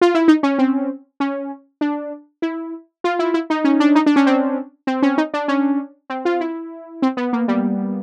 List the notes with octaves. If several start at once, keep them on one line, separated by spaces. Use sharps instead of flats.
F4
E4
D#4
C#4
C4
C#4
D4
E4
F4
E4
E4
D#4
C#4
D4
D#4
D4
C#4
C4
C4
C#4
D#4
D4
C#4
C4
F4
E4
C4
B3
A#3
G3